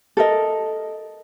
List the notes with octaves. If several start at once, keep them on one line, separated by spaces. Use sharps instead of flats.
A4 A#4 D#5